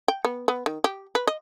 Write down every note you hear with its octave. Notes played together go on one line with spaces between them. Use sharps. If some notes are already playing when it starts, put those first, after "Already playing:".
G5
B3
B3
D#3
G4
B4
D#5